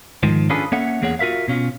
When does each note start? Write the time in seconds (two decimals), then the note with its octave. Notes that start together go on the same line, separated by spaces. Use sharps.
0.23 G#2 D#3 F3
0.50 C#4 D4 F4 G#4 A4 B4
0.72 A#3 C#4 A4 C#5 E5 F#5
1.02 E2 A#3 G#4 C#5 F#5
1.19 F4 F#4 A#4 E5 F5
1.48 B2 C#4 F4